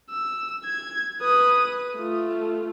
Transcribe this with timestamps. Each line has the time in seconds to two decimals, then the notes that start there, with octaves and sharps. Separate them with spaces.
0.10 E6
0.64 G#6
1.21 B4 D#6
1.96 A3 F4